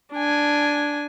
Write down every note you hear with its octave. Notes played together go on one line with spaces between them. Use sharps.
D4 G#5